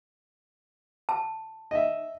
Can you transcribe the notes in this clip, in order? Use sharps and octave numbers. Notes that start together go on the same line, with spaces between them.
A5
D#5 E5